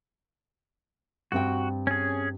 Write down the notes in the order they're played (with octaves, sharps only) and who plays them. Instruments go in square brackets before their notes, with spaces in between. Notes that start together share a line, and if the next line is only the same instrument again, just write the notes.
[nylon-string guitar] G2 C4 G5 [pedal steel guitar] F#4
[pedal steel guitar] C#4 G#4